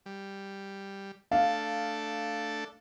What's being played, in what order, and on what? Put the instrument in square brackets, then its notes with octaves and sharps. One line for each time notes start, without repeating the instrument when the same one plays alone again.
[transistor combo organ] G3
[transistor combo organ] A3 D4 A4 [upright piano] F5